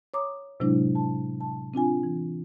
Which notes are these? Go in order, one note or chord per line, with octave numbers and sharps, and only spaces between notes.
C#5 A#5 D6 D#6
A2 C3 F#3 G#3 D4 E4
A5
A5
C4 D4 F4 G#5
E3